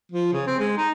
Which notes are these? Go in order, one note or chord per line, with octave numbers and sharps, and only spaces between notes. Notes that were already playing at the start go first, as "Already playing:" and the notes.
F3
C#3
C4
G#3
D#4